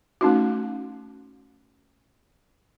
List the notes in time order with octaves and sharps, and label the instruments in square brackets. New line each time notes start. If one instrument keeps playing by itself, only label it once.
[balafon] A3 C#4 D#4 F#4